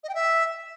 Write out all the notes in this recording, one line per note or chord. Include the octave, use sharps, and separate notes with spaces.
D#5
G5
E5